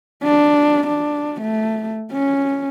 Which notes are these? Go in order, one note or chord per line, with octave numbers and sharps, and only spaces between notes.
D4
D4
A3
C#4